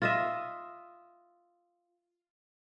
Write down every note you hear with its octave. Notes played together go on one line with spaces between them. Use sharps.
F4 D#5 E5